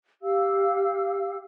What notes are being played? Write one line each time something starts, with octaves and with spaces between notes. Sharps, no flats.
G4 F5 E6